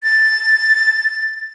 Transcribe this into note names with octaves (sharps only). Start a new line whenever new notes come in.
A6